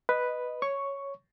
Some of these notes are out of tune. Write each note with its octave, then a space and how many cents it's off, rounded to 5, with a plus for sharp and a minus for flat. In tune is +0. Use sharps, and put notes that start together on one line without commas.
B4 +0 D#5 -5
C#5 +0 C#6 +5